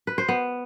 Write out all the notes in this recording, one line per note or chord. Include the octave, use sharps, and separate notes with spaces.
B4
C5
B3